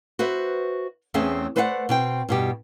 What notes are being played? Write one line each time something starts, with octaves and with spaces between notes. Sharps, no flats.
F#4 B4 C5 E5
E2 A3 C4 C#4 G#4 E5
A3 B4 C5 D5 F5 F#5
B2 C4 G5
G2 B2 G4